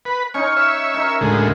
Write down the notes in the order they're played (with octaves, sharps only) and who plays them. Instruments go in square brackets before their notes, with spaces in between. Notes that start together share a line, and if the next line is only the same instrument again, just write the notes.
[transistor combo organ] B4
[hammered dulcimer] C#4 D#4 [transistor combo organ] C#5
[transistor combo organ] C#5 E5
[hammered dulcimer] D#4 A#4
[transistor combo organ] D2 A2 G#3